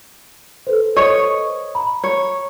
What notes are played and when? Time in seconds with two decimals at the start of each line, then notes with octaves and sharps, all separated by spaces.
0.67 A4 B4 C5
0.96 C#5 D#5
1.75 A#5 B5
2.04 C#5